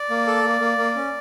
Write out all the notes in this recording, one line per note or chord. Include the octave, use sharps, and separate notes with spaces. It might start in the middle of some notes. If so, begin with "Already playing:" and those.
Already playing: D5
A#3
A4
A#3
A#3
A#3
C#4